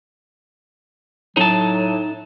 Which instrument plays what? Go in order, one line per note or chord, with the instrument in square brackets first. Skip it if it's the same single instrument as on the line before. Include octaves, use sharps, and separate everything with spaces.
[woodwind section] A2 F#3 [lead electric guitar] D#4 A5